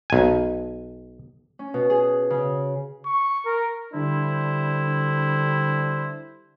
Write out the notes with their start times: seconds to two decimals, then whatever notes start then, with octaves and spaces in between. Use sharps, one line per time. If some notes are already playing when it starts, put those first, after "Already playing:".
0.10 B1 G#5
1.59 C#4
1.74 B2
1.90 G#4
2.30 C#3
3.05 C#6
3.46 A#4
3.93 D3 G3 D4 E4 C5